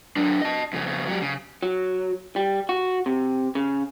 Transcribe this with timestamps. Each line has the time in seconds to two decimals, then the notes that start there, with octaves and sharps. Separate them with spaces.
0.16 F#3 D4
0.42 D#5 A5
0.73 F2 C#3
1.07 F#3 G4
1.22 C#3
1.63 F#3
2.36 G3
2.69 F#4
3.06 C3
3.55 C#3